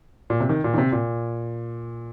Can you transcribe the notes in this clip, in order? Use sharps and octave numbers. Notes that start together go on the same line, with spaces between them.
A#2
C3
D#3
A#2
D#3
C3
A#2